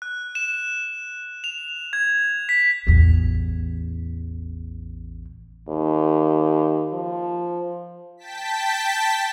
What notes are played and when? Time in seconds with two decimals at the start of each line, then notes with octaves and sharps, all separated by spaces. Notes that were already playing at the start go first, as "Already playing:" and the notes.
0.02 F#6
0.35 E7
1.44 F7
1.93 G#6
2.49 B6
2.87 A1 E2
5.68 D#2
6.93 F3
8.17 G5 A5 B6